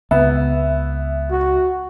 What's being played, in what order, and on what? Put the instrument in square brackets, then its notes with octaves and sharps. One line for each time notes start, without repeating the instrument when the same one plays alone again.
[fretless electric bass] C#2 [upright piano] B3 [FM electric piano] E5
[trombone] F#4